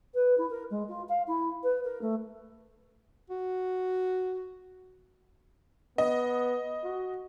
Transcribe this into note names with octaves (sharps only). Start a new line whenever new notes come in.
B4
E4
A#4
G#3
F4
F5
E4
B4
A#4
A3
F#4
B3 D#5
F#4